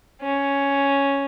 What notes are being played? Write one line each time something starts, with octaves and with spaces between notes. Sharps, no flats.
C#4